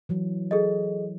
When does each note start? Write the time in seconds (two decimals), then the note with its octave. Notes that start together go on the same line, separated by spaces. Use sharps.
0.09 E3 F#3
0.51 G#4 A4 D#5